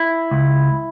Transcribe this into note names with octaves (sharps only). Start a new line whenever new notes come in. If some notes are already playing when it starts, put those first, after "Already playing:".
Already playing: E4
C#2